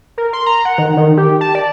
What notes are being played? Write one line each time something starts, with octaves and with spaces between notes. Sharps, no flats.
A#4
C6
A#5
F#5
D#3
D#3
G4
A5
D5